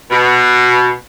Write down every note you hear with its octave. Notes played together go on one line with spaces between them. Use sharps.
B2